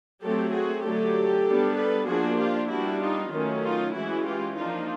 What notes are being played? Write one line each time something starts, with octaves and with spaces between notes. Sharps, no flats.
F#3 A3 C4 G4 A4
F#4 G#4
D3 F#3 A3 G4 A4
G3 B3 D4
A4 B4
F3 A#3 D4 F#4 G#4
F4 G4
G3 B3 D4 E4 F#4
D#4 F4
D#3 F#3 A3 C#4
D#4 F4
E3 G#3 C#4 E4 F#4
F4 G4
F3 A#3 D4 D#4 F4